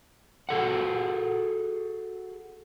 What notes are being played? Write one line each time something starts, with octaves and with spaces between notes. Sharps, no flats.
F#4 G#4 A4 F#5